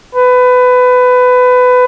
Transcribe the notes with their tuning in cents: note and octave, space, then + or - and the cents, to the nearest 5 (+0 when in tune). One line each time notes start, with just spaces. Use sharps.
B4 +20